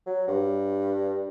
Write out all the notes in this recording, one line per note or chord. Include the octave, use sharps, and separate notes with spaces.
F#3
G2